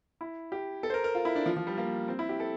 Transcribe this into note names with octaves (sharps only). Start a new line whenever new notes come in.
E4
G4
A4
C5
A#4
A#4
F4
E4
D4
F3
F3
G3
A#3
C4
E4
G4
A4